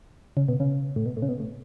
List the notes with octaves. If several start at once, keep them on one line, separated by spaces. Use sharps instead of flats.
C#3
B2
C#3
A2
B2
A2
C#3
B2
A2